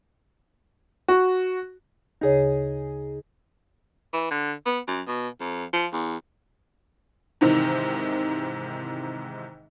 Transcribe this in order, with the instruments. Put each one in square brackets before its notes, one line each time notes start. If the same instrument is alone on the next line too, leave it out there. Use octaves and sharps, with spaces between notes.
[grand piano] F#4
[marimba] D2 C#3 C#5 [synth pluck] D#4 G#4
[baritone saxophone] E3
D3
B3
F#2
B2
F2
F3
E2
[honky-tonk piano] G#2 C3 D#3 E3 D#4